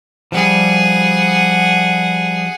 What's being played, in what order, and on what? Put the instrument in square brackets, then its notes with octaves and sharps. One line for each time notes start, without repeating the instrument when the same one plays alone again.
[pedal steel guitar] F3 G3 [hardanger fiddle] G#4 F#5